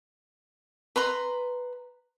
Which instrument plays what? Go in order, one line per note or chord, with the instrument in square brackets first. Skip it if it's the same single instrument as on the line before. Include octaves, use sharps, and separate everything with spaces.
[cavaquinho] B4 A#5 C6